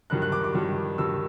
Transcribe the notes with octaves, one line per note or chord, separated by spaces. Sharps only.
G2 D#3 F#3 F#6
F#6
D6
D6
G2 D#3 F#3
G2 D#3 F#3 E6